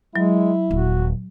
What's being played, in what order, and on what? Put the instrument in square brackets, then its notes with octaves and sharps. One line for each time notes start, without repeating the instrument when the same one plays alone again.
[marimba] F#3 [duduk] G#3 [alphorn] E4
[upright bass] D#1 [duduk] F#4